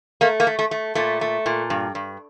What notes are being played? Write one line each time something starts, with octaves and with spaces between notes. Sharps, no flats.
A3 A#3
A#3
A3
A3
A3
A#2 A3
A3
A#2
G2
G2